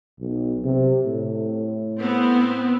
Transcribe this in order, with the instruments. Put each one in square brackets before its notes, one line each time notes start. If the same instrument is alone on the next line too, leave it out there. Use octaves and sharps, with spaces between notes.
[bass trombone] B1
C3
A2
[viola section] B3 C4